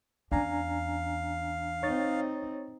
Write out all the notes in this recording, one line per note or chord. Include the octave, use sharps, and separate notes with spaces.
E2 C#4 D4 F5 G#5 A#5
C4 D#4 C#5 A6